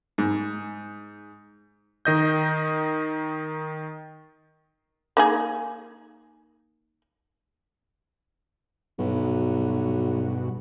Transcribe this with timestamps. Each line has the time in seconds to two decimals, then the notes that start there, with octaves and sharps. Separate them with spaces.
0.18 G#2
2.05 D#3 D#5 G6
5.17 A#3 D#4 G#4
8.99 B1 G2 B2 F#4